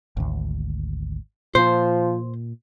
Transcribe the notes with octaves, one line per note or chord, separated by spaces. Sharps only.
G#1 D2
A#2 F3 C5